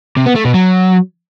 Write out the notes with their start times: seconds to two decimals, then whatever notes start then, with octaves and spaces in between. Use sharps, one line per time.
0.17 C3
0.26 B3
0.36 A3
0.45 B2
0.54 F#3